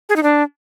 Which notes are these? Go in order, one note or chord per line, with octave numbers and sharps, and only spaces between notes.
G#4
D#4
D4